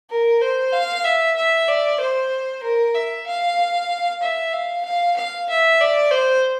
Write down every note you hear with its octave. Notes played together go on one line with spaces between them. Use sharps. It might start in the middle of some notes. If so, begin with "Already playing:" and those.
A#4
C5
F5
E5
E5
D5
C5
A#4
E5
F5
E5
F5
F5
F5
E5
D5
C5